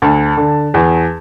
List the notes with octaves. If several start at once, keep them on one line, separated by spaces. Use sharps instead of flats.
D2 A5
D3
E2